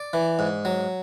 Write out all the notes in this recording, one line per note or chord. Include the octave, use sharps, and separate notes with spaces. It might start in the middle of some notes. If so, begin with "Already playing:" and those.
Already playing: D5
E3
G#2
F#3